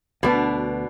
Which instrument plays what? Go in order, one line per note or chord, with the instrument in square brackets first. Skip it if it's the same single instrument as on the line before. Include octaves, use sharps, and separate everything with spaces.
[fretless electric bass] D2 G3 B3 [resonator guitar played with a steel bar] B2 D4